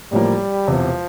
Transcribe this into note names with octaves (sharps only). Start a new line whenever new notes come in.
A1 A2 F3 G3 A#3
E1 E2 C3 F3